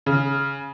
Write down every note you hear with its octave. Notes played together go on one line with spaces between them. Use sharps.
C#3